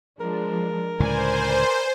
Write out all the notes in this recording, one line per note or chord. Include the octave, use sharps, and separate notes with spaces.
F3 G#3 D4 A#4
C#2 A2 D3 B4 C5 D5 G#5